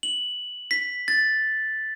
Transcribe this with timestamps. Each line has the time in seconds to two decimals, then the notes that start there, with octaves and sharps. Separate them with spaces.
0.03 F#7
0.71 B6
1.08 A6